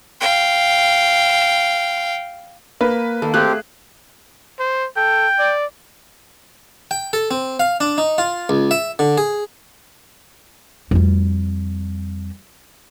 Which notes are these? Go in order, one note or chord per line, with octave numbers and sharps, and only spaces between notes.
F5 G5
A#3 B4
D#3 A#3 A4
A3 C4 G4 G#4 F5 F#6
C5
A4 G5
D5
G5
A4
C4
F5
D4
D#4
F4
C#2
E5
D3
G#4
F2 G3